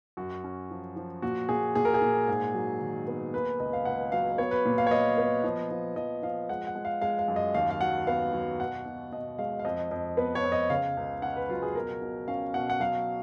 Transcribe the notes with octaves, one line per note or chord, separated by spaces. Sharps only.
F#2 F#4
C#4
F3
F3
A#2 F#4
A#2 G#4
A#2 G#4
A#4
G#4
A#2
G#2
F#3
D#3
B3
A#3 B4
C#2 D#5
F5
C#2 F#5
F#3 F5
B3 C#5
B4
A#2
F5
C#5
B3 D#5
B3
F3
F3
F3 D#5
F3 F5
G#3 F#5
F#5
G#3
F5
G#3 F5
F5
F#2
D#5
D#2 F5
F5
F#3 F#5
B3 F5
F#3
B2 F#5
B2
B2 D#5
G#3 F5
F5
F2 D#5
F2
B3 B4
C#5
F2
D#5
C#3 F5
C#2
C#4 F#5
B4
F#3 F4
G#4
B2 A#4
B2
C#4 F5
B2 F#5
F#5
F#3 F5